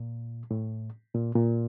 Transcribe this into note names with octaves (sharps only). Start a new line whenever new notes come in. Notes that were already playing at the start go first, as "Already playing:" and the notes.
Already playing: A#2
A2
A#2
A#2